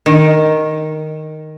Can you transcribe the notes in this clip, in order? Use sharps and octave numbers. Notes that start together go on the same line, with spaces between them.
D#3